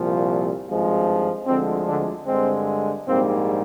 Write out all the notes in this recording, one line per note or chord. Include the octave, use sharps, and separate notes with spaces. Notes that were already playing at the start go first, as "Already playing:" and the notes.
Already playing: C2 A#2 F3
G#1 G2 F3 G#3
D2 D3 F3 G#3 C4
D3 D4
G2 D3 G#3 C4
A#1 G#2 G3 A#3 C4